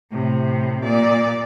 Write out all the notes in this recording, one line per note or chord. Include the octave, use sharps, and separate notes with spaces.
A2 C3
A#2 D5